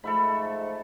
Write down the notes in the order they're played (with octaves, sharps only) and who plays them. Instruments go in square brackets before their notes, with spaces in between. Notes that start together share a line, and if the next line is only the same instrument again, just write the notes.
[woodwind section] G#2 F3 A3 [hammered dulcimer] A4 E5 B5